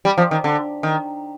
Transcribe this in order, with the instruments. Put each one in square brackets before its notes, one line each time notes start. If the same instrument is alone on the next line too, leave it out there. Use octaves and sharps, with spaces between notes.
[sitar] G3
F3
D#3
D3
D#3